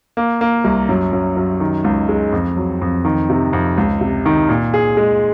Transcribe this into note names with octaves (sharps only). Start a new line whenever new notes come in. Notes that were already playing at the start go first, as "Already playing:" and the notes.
A#3
A#3
C2
F#2
F#2
F#2
D#3
C#2
G#3
F2
F#3
F2
D#3
C3
F2
C#2
C3
D#3
A#2
G#4
G#3